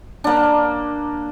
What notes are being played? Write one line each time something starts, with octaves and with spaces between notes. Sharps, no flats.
A#3 D4